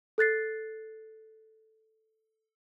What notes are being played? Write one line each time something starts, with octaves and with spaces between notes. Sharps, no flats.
A4 F#6 A6 C7